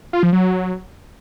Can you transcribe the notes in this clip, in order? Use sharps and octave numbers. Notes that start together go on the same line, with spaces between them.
F4
F3
F#3